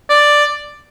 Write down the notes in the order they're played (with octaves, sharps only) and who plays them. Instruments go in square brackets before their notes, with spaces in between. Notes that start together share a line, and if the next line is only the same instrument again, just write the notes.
[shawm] D5